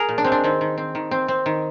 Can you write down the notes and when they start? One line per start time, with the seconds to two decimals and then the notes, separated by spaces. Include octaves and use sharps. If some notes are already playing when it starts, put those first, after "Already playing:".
Already playing: G#4 A#4
0.09 A#2
0.18 D4
0.24 G#3 C4
0.32 D4
0.44 D#3 C4
0.61 D#3
0.78 C4
0.95 D#3
1.11 C4
1.28 C4
1.46 D#3